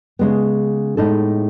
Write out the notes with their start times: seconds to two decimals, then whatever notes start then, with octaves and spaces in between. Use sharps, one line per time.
0.19 C#3 G#3 B3
0.97 A2 G#3 D#4 A4